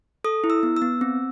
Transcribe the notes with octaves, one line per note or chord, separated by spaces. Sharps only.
A4 D#6
E4
E6
B3
E6
B3
C4